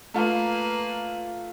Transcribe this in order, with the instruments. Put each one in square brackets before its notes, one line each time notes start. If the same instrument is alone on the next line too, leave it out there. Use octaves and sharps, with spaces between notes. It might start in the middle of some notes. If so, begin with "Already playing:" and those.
[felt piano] A3 F4 [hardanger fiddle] A#3 B4